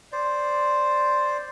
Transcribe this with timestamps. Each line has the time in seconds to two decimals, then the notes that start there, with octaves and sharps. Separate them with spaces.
0.12 C5 D5